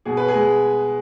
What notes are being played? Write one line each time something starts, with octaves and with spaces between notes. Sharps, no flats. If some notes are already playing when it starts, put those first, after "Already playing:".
B2 G#4
B4
G#4
G#3